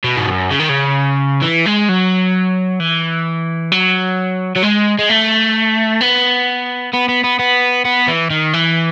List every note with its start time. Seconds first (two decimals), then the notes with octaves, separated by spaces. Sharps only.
0.04 B2
0.17 G#2
0.28 F#2
0.51 C#3
0.59 D#3
0.69 C#3
1.42 E3
1.66 G#3
1.89 F#3
2.80 E3
3.72 F#3
4.56 F#3
4.63 G#3
4.99 G#3
5.09 A3
6.01 B3
6.93 B3
7.08 B3
7.24 B3
7.39 B3
7.85 B3
8.08 E3
8.30 D#3
8.54 E3